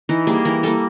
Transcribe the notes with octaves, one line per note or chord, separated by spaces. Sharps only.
E3 D#4
G3 A#3 G#4
E3 A#4
G3 A#3 A4